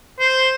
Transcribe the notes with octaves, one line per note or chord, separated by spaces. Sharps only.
C5